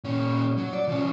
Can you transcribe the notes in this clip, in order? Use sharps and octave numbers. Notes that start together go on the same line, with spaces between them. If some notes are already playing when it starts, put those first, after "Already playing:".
A#2 C#4
F#3
D5
F3 C#4